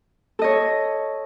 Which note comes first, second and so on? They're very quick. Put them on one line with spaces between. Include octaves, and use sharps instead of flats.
A4 D#5 C#5